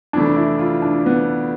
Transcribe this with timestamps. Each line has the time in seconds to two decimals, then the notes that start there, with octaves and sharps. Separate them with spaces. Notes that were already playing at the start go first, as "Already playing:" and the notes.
0.13 F2 C3 E3 A3 D4
0.36 E4
0.59 F4
0.82 D4
1.06 B3